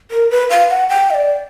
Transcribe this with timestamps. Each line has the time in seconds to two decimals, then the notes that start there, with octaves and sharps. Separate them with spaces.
0.11 A#4
0.30 B4
0.50 F5
0.70 F#5
0.89 G5
1.10 D#5
1.14 D5